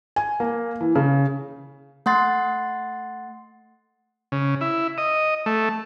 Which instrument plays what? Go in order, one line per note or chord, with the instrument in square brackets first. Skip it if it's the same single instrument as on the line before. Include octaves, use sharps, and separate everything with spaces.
[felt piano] G#5
A#3
E3
C#3
[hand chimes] A3 F#5 C6 A6
[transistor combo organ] C#3
E4
D#5
A3